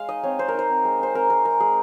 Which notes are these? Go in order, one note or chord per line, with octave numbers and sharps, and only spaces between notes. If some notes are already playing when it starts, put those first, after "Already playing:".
Already playing: G#3 F5
D#4 D#5
C4 C#5
C4 C5
A#4
D#4 C5
C4
G#3
D#4 C5
C4 A#4
G#3 A#4
G#3 A#4
G#3 G#4